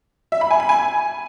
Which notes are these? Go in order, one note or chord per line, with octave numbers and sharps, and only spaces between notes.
E5
B5
G#5
B5
G#5